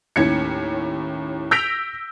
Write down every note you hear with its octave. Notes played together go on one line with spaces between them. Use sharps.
D#2 A2 C#4 E4 G#6 C#7
E6 G6 A#6 B6 D7 F7